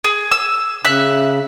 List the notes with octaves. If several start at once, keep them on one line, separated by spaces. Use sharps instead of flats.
G#4
E6
C#3 E5 F#6